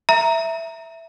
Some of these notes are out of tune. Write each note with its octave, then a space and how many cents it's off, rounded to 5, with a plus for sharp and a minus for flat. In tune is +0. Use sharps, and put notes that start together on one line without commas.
E5 +0 A#5 +0